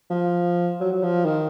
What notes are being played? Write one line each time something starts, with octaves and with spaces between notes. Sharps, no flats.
F3
F#3
F#3
F3
D#3